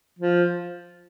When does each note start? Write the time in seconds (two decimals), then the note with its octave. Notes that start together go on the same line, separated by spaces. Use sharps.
0.19 F3